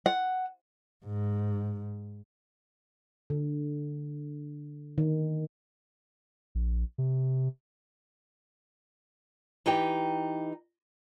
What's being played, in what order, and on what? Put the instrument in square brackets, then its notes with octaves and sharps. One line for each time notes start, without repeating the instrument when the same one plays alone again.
[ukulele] F#5
[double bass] G#2
[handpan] D3
D#3
[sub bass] A#1
C3
[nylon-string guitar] E3 D#4 G4 G5